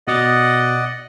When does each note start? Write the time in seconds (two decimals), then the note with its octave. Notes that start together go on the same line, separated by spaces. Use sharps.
0.08 B2 D5 D#5 F#5 D#6 A6